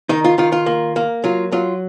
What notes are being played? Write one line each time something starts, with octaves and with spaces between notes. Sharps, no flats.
D#3 D#4
F4
D#3 F4
F4
A#3
A#3
F#3 F4
F#3 F4